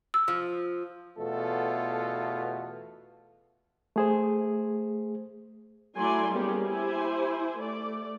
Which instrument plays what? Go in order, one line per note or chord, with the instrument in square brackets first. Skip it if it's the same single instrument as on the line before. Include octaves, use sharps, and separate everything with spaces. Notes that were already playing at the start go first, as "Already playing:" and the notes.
[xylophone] E6
[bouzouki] F3
[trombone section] E2 B2 A3 F4 A4
[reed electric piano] A3 G#4 C5
[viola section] F#3 A3 E4 D5 G#5 C6
G3 A#3 B3 C#4 G4 G#4
E4 G4 C5 G#5
A3 D5